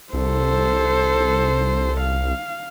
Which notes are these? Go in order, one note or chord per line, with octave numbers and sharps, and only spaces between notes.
C2 A4 C5
F5